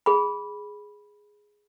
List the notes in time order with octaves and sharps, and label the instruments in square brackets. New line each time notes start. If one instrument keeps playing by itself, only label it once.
[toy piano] G#4 B5